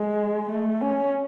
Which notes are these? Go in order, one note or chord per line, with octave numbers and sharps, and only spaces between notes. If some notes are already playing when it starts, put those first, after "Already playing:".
Already playing: G#3
A3
C#4